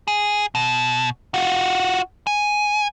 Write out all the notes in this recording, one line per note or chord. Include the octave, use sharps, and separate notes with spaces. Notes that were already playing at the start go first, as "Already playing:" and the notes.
G#4
B2
F4 F#4
G#5